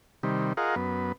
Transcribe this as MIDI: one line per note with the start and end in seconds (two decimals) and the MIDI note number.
0.23 0.53 48
0.23 0.53 51
0.23 0.53 55
0.57 0.75 65
0.57 0.75 68
0.57 0.75 70
0.57 0.75 75
0.57 0.75 77
0.57 0.75 78
0.76 1.12 42
0.76 1.12 59